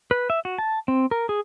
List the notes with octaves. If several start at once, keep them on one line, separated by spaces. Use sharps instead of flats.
B4
E5
F#4
A5
C4
A#4
G#4